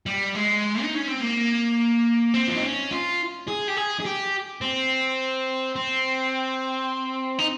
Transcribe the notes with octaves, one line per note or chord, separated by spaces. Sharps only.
G3
G#3
D#4
C#4
C4
A#3
C4
F4
D#4
C#4
F4
G#4
G4
G#4
G#4
G4
C4
C4
D#4